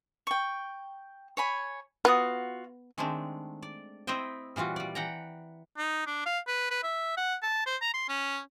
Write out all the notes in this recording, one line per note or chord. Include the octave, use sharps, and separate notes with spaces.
G5 C#6
C#5 G#5 B5
B3 F4 F#4 D#6
D#3 G#3 A3 C4 D4
D5
C4 E4 C5 D#5 E5 G5
A#2 E3 G3 F4 F#4
G3 D5
E3 F#5 G5 A#5
D#4
D4
F5
B4
B4
E5
F#5
A5
C5
A#5
C6
C#4